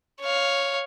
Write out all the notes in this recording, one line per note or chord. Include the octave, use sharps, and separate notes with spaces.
C#5 F5